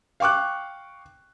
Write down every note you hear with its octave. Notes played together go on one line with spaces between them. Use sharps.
F5 G5 C#6 D6 F#6